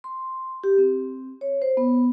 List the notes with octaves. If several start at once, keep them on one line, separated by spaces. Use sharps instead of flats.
C6
G4
C4
C#5
C5
B3